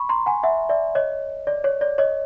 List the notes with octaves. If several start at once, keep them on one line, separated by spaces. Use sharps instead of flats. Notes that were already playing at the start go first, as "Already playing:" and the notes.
Already playing: B5 C#6
A#5 C6
F#5 G#5
E5 F#5
D5 E5
C#5 D#5
D5
C#5
D5
C#5 D#5